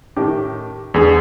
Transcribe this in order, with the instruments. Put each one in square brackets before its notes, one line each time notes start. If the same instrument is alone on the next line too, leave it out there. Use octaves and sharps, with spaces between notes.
[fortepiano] A2 D#3 G4
[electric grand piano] E2 G#4 [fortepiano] D3 G#3